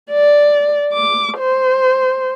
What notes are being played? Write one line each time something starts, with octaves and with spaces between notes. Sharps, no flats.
D5
D6
C5